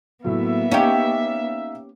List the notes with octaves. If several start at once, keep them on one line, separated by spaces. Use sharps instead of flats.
A2 F#3 A#3 B3 E5
C#4 D#4 G4 F5 A#5